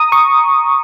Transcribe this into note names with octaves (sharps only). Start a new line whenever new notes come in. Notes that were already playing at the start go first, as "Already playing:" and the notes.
Already playing: A#5 D#6
C#6